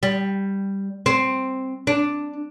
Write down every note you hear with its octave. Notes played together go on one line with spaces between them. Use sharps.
G3
C4
D4